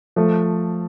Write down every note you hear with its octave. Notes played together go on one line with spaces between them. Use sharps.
F3 A3